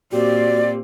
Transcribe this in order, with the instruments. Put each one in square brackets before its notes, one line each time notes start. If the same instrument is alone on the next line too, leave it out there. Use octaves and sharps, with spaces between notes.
[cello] A#2 C4 [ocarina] F#4 [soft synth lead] G4 [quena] D5